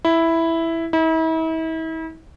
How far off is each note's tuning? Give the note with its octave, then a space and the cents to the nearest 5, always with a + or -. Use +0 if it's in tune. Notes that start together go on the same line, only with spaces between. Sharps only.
E4 +0
E4 -40